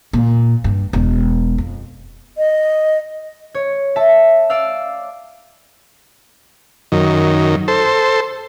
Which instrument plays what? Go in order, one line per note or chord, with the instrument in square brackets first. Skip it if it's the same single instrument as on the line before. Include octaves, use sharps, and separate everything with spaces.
[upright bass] A#2
G2
E1
F2
[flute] D#5
[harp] C#5
E5 A5
D5 F5 E6
[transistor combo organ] F#2 D#3
A4 C5